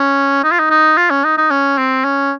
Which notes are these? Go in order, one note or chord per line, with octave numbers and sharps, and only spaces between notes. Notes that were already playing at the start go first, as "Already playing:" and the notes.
Already playing: C#4
D#4
F4
D#4
D#4
F4
C#4
D#4
D#4
C#4
C4
C#4